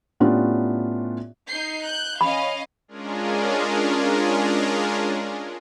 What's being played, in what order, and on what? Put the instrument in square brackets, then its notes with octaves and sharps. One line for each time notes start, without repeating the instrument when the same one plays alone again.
[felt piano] A2 B3 C#4 D4 F4 G4
[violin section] D#4 G6 C7
F#6 G6
[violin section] C#4 D#5 F5 [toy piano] B5
[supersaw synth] G#3 C#4 D4 F4 G#4 A#4